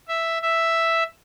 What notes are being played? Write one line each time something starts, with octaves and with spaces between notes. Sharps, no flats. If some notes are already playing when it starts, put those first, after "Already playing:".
E5
E5